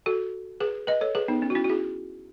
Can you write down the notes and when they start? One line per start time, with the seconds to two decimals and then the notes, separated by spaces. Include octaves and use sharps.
0.06 F#4 A4
0.60 G#4 B4
0.87 B4 D#5
1.01 A4 C#5
1.15 G#4 B4
1.28 B3 D#4
1.42 C#4
1.50 F#4
1.55 C#4 E4
1.65 F#4
1.69 E4 G#4